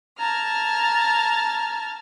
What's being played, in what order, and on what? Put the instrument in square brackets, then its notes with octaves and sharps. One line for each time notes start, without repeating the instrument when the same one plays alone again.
[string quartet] A5 F6 G#6 [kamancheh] A#5